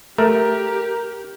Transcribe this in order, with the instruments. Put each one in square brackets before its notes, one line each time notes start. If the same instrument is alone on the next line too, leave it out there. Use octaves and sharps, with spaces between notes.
[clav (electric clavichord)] A3 [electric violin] G4 [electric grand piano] A#4